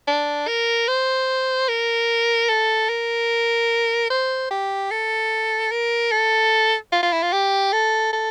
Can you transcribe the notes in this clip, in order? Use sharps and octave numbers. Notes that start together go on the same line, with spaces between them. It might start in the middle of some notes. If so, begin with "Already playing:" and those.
D4
A#4
C5
A#4
A4
A#4
C5
G4
A4
A#4
A4
F4
F4
E4
F4
G4
A4
A4